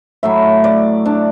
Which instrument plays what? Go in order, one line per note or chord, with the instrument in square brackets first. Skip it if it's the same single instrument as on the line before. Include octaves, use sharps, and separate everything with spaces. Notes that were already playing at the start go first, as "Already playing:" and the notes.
[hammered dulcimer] A2 F#3 E5
D5
D4